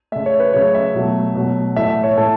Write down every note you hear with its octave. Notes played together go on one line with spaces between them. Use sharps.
C#3 A3 E5
C#5
B4
C#3 F#3 A3 C#5
E5
B2 F#3 A3
B2 F#3 A3
A2 E3 A3 E5
E5
C#5
A2 A3 A4